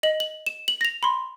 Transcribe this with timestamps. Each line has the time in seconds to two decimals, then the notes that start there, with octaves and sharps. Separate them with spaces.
0.03 D#5 F#7
0.20 F#7
0.46 E7
0.68 F#7
0.81 A#6 F7
1.03 B5 C6